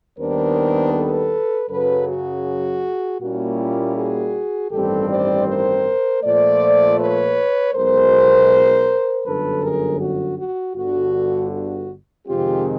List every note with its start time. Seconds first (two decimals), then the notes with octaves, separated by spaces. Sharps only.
0.18 D#2 D#3 G3 B3 D4 A#4 C5
0.93 A4 B4
1.69 F#2 C#3 F#3 A4 B4
2.06 F#4 G#4
3.20 A#2 G3 A#3 C#4 E4 F#4
3.58 F4 G4
3.96 F#4 G#4
4.71 A1 G2 D#3 G3 C4 G4 A4
5.09 C5 D5
5.47 A#4 C5
6.22 A#2 F3 A3 C5 D5
6.98 B4 C#5
7.74 B1 B2 G#3 A#4 C5
9.25 G1 F#2 D3 A4 B4
9.62 G#4 A#4
10.00 F#4
10.38 F#4
10.76 G1 G2 D3 F#4
11.51 F#4
12.27 F2 C3 D#3 G#3 C4 F4 G4